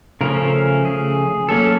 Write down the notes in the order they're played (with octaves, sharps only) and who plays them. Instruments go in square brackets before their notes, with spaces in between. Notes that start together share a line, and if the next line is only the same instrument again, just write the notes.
[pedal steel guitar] C#3 F3 A3 C#4 A#4
G#4
F#3 A#3 C#4 A4